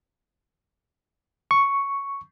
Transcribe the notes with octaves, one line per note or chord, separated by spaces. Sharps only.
C#6